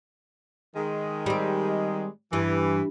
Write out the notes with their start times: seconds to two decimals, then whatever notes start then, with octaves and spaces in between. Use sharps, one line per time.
0.76 D#3 G#3
1.26 G3 C4
2.33 G2 E3